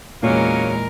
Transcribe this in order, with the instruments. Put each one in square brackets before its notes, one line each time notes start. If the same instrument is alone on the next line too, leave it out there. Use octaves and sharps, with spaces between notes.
[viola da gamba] E2 G#3 A#4 [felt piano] A#2 [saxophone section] F#3 A#3 C#4